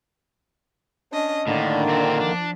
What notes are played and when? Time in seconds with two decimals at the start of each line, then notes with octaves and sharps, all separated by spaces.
1.12 C#4 D4 D#5
1.47 A2 D3 D#3 A#3 D4
1.89 A#2 C4
2.20 F3 D4